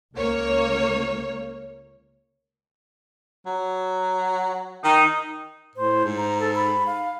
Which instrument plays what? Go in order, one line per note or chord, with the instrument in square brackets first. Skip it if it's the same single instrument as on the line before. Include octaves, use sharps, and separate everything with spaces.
[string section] C#2 A#3 C#5
[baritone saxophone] F#3
[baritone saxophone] D#3 [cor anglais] D#4
[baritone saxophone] A2 [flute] C5
[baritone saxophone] G#2
[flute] A#5
A4
B5
F5